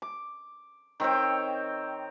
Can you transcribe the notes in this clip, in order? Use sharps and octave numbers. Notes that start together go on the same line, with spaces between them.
D6
D#3 C4 C#5 G5